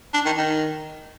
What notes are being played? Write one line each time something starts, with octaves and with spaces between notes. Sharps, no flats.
D4
D#3
D#3